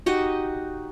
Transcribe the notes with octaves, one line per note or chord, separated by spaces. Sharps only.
D#4 F#4 G4 D#5